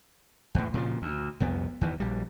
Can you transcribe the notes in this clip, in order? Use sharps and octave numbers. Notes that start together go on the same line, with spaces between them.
E2 A2
A#2 C#3 E3 F3
D2
C2 F2 B3
E2 D#3 E3
A#1 G3